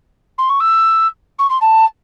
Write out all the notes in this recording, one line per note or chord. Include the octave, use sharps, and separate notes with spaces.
C6
C#6
E6
C#6
C6
A5